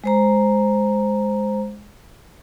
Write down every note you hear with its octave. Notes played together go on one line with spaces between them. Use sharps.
G#3 C5 A#5